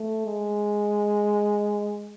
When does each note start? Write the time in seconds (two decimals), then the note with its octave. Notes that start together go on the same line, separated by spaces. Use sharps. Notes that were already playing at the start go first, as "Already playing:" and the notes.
Already playing: A3
0.26 G#3